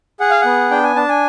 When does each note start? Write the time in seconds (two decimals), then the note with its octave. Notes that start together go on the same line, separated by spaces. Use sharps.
0.20 G#4 F#5
0.30 F5
0.41 B3 F#5
0.70 D4 G5
0.84 G#5
0.96 D4 A5
1.09 G#5